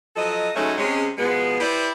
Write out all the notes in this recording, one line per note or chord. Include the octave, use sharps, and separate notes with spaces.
F3 F#3 A4 D#5
F#3 G#3 A3 C#4 D#4 F#4
C3 G#3 C#4
B2 F3 G#3 B3
E4 G4 B4 C5 D5 E5